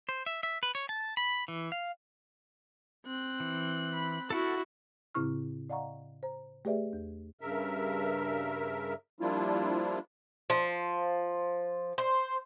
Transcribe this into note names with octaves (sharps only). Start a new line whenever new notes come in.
C5
E5
E5
B4
C#5
A5
B5
E3
F5
C4 F#6
E3
B5
E4 F#4 A4 F#5 F6
A2 C#3 C4 E4 C#6 F6
D5 D#5 F5 F#5 A#5 C#6
C5 A#5
A3 G4 G#4 B4 D5 E5
E2
G2 C#3 A#4 E5
F3 G3 A#3 D4 E4 F4
F3
C5